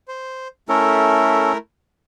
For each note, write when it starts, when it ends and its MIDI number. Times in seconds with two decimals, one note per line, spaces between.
0.08 0.48 72
0.69 1.57 57
0.69 1.53 61
0.69 1.57 64
0.69 1.53 69
0.69 1.57 70